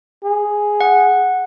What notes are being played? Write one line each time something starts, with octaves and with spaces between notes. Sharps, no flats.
G#4
F#5